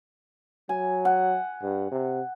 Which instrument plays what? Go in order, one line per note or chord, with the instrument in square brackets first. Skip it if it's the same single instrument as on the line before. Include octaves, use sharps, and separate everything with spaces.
[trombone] F#3 [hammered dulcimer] G#5
[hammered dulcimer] F#5
[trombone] G2
C3